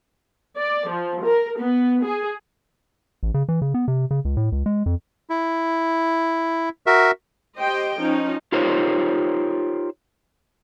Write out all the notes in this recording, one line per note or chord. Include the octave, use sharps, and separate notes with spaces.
D5
F3
A#4
B3
G#4
A1
C#3
E3
C#3
B3
C3
C#3
C#2
A2
C#2
G#3
F2
E4
F#4 A#4 E5
G4 C5 D#5 G5
F3 C#4 D#4
D#4 F4 G4 A#4 C5 C#5